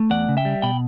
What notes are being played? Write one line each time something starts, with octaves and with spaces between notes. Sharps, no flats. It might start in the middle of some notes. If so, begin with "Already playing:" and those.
Already playing: A3
E2 D5 F#5
C#3
E5 G5
G3
B2 G5 B5